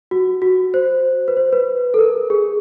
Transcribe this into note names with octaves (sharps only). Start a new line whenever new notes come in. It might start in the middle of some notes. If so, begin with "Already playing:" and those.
F#4
F#4
C5
B4
C5
B4
A4
A#4
G#4